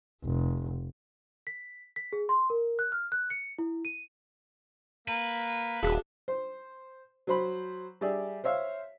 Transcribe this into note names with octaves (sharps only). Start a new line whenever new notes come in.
F1
B6
B6
G#4
C6
A#4
F#6
F6
F#6
C#7
E4
D#7
A#3 B4
D#1 D4 F#4 G#4 F5
C5
F#3 C5 B5
G3 G4 G#4 D5 E5
C5 C#5 E5 F5